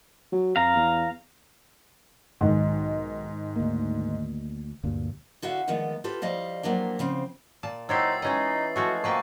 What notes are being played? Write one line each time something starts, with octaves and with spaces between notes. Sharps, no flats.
F#3
F2 F5 A#5
E2
B1 G#2 D#3 G#3
D2 A#3
D2 G2 A#2
D3 F#4 E5 F5
D3 D#3 F3 G#3 A3 B3
F4 G4 A4 B4
F3 G3 D#5 F5
F3 F#3 A#3 D4 G4
C#3 F3 C4
A#2 A5
F#3 D#4 E4 G4 C5 E6 A6 C7
E3 G#3 C#4 D#4 D#5
F3 G#3 A3 F#4
B2 F3 A#3 B4 G5 C#6